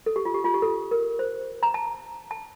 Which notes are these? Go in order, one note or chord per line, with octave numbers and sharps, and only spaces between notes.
A4
G4
F4
G4
F4
G4
A4
A#4
C5
A#5
A5
A5